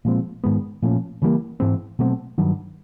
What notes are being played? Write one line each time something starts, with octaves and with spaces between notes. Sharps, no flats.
A#2 F3 G#3 C4
G#2 D#3 G#3 B3
A#2 F3 A3 C#4
C#3 E3 G3 A#3
G#2 E3 G#3 C4
B2 F#3 A3 C4
G2 D#3 F#3